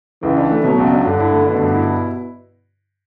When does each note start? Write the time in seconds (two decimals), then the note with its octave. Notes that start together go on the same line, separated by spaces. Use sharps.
0.23 C#2 E3
0.37 D4
0.51 A3
0.64 B2 F#3
0.78 C#2
0.92 D4
1.05 G2 D3
1.20 E4
1.33 A3
1.48 B2 D3
1.61 G2
1.75 E4